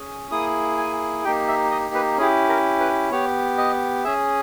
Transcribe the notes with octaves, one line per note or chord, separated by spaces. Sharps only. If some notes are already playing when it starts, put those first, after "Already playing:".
Already playing: C#4 G#4
A#3 E4 G#4 D#6
G#5
A#3 D#4 G4 G5
E5
D#5
B4
C#4 E4 G4 G#4
A#4
B4
B3 G4 C#5
D#5
C#4 G#4 E5